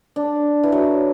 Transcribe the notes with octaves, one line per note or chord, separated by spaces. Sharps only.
D4
E3
F#3